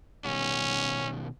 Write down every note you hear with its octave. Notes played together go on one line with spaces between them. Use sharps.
B2 D#3 G3 C#4